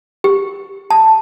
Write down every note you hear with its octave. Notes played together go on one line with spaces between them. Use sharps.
G4
A5